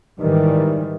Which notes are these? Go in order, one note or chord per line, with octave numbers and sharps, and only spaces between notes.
G#2 D#3 E3 G3